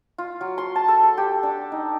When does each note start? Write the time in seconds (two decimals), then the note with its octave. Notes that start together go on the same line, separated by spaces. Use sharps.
0.18 F4
0.41 F#3
0.58 C6
0.76 A5
0.88 A4
1.03 A4
1.18 G4
1.43 D4
1.72 D#4